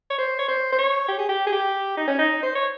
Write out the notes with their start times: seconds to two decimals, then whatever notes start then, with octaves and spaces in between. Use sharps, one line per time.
0.10 C#5
0.18 C5
0.39 C#5
0.48 C5
0.72 C5
0.78 C#5
1.08 G4
1.18 G#4
1.29 G4
1.47 G#4
1.52 G4
1.97 D#4
2.07 C#4
2.19 D#4
2.43 C5
2.55 C#5